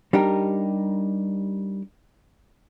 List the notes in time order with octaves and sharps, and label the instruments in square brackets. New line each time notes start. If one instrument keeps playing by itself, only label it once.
[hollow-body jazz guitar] G3 D4 D#4 G4 A#4